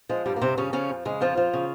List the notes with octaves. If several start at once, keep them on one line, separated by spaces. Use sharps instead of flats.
F3 G#3
G2 G3
A#3
G2 C3 C4
C#3 F3 C#4
C#3 F3 C#4
F2
C#3 G#3
F2 F3 F4
F3
C#3